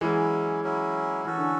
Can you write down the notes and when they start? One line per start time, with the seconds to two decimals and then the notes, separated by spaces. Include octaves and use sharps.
0.01 E3 F#3 G#3 C#4 E4
0.64 F#3 C#4 E4
1.25 E3 C#4 F#4 A4
1.38 D3